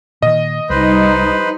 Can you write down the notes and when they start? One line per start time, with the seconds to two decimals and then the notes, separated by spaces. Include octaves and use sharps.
0.22 A#2 D#3 D#5
0.70 C2 G3 D#4 B4 C5